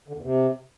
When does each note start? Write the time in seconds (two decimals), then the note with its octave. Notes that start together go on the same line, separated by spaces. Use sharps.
0.08 D3
0.15 E2
0.22 C3